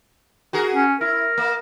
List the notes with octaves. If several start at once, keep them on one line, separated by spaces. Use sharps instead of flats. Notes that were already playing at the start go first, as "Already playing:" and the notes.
F#4 G#4 A#4
C#4
E4 A#4
A#3